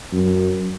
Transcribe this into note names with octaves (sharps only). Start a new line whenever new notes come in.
F#2